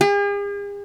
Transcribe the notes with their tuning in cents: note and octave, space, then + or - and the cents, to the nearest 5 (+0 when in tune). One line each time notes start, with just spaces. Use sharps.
G#4 -45